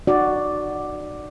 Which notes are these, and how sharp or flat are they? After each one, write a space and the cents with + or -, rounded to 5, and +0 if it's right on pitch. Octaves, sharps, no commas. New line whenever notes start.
D#4 -40 F#4 +5 D5 +0